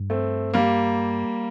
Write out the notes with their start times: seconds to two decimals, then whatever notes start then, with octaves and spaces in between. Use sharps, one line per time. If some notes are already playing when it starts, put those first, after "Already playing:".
Already playing: G2
0.10 A3 C4
0.54 G3 A#3